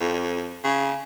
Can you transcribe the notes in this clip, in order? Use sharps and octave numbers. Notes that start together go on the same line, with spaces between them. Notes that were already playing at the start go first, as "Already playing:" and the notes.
F2
C#3